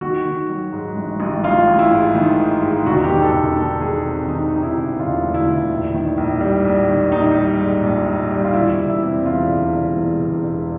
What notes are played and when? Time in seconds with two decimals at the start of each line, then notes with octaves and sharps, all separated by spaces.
0.01 D#3 F#4
0.25 D#3
0.49 F#3
0.73 G#2
0.96 A1
1.20 A1
1.44 A1 F4
1.67 A1
1.79 E4
1.91 G#2
2.15 D#3
2.38 G#2
2.62 G#2
2.86 E1 F#4
3.04 G4
3.09 D#3
3.22 A4
3.33 E1
3.56 D#3 A4
3.80 D#3 G#4
4.04 C3
4.28 D#3 D#4
4.51 C3 D#4
4.63 E4
4.76 E1
4.99 E1 F4
5.23 D2
5.34 E4
5.47 E1
5.70 A#1
5.94 D#3
6.17 A#1
6.40 G3
6.65 A#1
6.89 D#3
7.12 A#1 D#4
7.36 G3
7.59 G#2
7.83 A#1
8.06 A#1
8.31 G3
8.44 F4
8.53 E1 E4
8.77 E1
8.90 E4
9.02 C3
9.25 E2 F4
9.49 E1
9.72 E1
9.96 E2
10.19 E1
10.44 E1